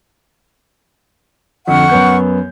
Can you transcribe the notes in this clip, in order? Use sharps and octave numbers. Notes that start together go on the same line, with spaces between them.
F2 D3 F#5 C#6 F6
F#2 B3 G6